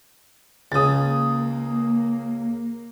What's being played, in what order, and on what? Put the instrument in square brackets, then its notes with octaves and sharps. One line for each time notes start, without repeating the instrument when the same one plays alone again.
[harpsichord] C#2 C#3 [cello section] A#3 [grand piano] D#6 A6